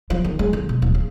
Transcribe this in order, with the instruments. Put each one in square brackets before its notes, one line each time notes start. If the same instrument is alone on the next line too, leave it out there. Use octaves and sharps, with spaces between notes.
[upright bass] F3
D#3
G#3
D3
B2
D1
C#3